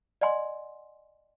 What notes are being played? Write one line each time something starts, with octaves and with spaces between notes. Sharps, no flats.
D5 D#5 F#5 G#5 C6